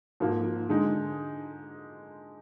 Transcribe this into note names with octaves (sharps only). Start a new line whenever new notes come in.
G#2 F3 A#3
D3 G#3 D#4